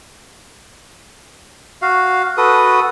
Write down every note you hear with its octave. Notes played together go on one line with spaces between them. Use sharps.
F#4 F5
F#4 A4 B4 D#6